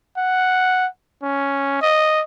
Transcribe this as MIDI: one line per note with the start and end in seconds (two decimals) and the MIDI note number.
0.18 0.87 78
1.23 1.78 61
1.82 2.22 75